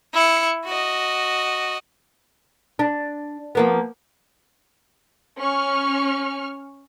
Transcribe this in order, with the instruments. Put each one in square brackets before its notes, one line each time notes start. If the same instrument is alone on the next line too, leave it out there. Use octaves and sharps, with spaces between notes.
[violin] E4 C#7
F#4 D#5
[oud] D4
F3 A#3 B3
[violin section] C#4 C#6 F6